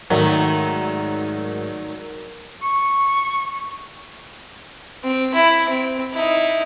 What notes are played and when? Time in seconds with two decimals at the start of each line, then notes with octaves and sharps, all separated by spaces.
0.10 G#2 D#3 F#3 A3 A#4 D5 A#5
2.62 C#6
5.04 C4
5.35 E4
5.69 C4
6.13 D#4 E4